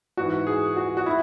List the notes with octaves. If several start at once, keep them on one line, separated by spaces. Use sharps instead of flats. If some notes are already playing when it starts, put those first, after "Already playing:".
G#2 E3 F#4
G#4
F#4
F#4
E4